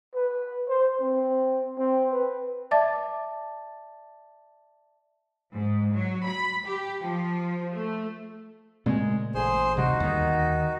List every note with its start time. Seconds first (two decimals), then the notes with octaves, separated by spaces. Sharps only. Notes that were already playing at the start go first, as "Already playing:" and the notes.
0.14 B4
0.69 C5
1.01 C4
1.78 C4
2.12 B4
2.71 D5 E5 A5 D6 A6
5.55 G#2
5.93 F#3
6.27 B5
6.66 G4
7.02 F3
7.72 A3
8.86 A#2 C#3 G#3 A3 C4
9.35 A1 G#4 C5 C6
9.77 D2 C3 G3 D#4 F#4
10.00 D#2 D#3